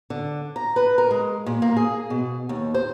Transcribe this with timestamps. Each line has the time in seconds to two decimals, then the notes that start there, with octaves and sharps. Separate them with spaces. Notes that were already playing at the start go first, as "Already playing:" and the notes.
0.10 D3
0.56 A#5
0.76 B4
0.98 A#4
1.11 G#3
1.46 A#2
1.62 A#3
1.77 G#4
2.10 B2
2.49 D#2
2.74 C5